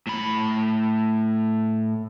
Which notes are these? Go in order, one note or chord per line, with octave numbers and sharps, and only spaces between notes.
A2 B5